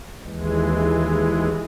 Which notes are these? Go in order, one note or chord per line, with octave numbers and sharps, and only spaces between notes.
D#2 E3 G#3